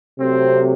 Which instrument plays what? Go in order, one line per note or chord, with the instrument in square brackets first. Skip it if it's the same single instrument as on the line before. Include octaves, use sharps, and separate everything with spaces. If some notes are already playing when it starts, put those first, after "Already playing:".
[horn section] C3 F#3 A3 C4